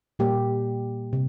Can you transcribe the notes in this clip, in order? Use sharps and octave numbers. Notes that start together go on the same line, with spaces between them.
A#2 G3 A#3 G4
C3